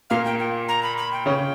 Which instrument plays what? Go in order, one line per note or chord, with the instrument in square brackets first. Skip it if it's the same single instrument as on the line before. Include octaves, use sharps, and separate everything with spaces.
[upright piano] A#2 A#3 [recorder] F5
[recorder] G5
G5
A#5
B5
B5
G5
[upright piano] C#3 C#4